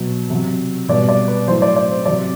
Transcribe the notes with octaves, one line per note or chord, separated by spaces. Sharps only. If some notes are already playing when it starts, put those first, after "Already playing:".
Already playing: B2 F#3
C3 F#3
B2 G3 D5
D5
B4
A2 F#3 C5
D5
D5
C5
C3 F#3 D5